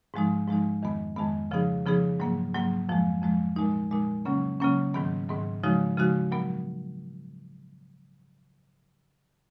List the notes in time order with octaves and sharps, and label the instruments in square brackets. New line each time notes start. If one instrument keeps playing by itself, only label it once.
[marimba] G#2 F3 G#3 D#4
G#2 F3 G#3 D#4
F2 D#3 G#3 B3
F2 D#3 G#3 B3
C#3 F3 B3 D#4 G#4
C#3 F3 B3 D#4 G#4
G#2 F#3 A#3
G#2 F#3 A#3
F2 F3 G#3
F2 F3 G#3
A#2 G#3 D#4
A#2 G#3 D#4
C#3 F#3 A#3 C#4
C#3 F#3 A#3 C#4
G#2 D#3 F#3 B3
G#2 D#3 F#3 B3
C#3 F3 G#3 D#4 F#4
C#3 F3 G#3 D#4 F#4
A#2 F#3 B3